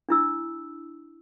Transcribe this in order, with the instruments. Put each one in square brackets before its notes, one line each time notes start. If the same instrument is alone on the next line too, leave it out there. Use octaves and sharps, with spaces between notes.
[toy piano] D4 E4 E6